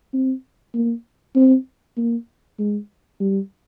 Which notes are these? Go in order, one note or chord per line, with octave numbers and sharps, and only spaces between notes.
C4
A#3
C4
A#3
G#3
G3